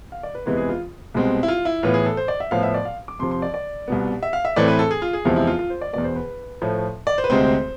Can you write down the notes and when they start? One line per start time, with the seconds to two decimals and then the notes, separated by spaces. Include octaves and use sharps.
0.12 F5
0.23 D5
0.35 B4
0.46 E2 C3 E3 G#3 B3
0.57 G#4
0.69 F4
1.14 C2 B2 G#3 C4
1.43 E4
1.48 F4
1.65 E4
1.83 A2 E3 B3 F4
1.94 G#4
2.06 A4
2.17 C5
2.28 D5
2.40 E5
2.51 A2 F3 B3 F5
2.63 E5
2.74 D5
2.85 F5
3.08 D6
3.19 F2 C3 F3 C6
3.31 C6
3.42 D5
3.54 D5
3.88 C2 B2 B3
4.23 E5
4.33 F5
4.45 E5
4.56 A2 E3 A3 C4 D5
4.68 B4
4.79 A4
4.91 G#4
5.02 F4
5.13 G#4
5.25 E2 C3 F3 G#3 C4 E4
5.36 E4
5.47 F4
5.59 F4
5.70 C5
5.81 D5
5.93 E2 B2 B3 D5
6.04 C5
6.16 B4
6.62 A2 F3 A3
7.07 D5
7.18 C5
7.24 B4
7.30 D2 C3 G#3 C4 C5